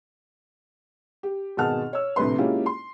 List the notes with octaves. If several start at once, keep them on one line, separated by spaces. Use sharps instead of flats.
G4
G#1 B2 G#4 F#5 A5 F6
C#5 E6
A#1 A2 C3 B4 C6
G#3 A#3 C#4 E4 F4 G4
C6